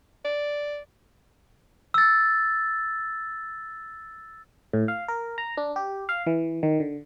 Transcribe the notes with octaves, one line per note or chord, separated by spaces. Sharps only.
D5
E6 A6
A2
F5
A#4
A#5
D4
G4
F5
E3
D#3
D3